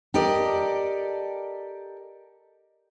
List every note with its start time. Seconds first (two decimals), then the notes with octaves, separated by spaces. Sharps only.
0.14 G4 A4 A#4 D5 D#5